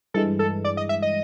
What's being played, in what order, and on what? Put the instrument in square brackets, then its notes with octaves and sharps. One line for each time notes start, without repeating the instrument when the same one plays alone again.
[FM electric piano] G2 E3 G#3 [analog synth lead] A4
[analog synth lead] A4
D5
D#5
E5
D#5